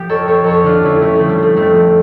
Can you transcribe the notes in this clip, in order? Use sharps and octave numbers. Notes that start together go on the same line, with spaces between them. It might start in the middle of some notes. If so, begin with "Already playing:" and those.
Already playing: F3 G4
F2 A4 C#5
F2 A4 C#5
F2 A4 C#5
D3 D4 F4
F2 C#4 E4
D3 A3 C#4
F3 A3
G3
F3 A3
F2 A3
F2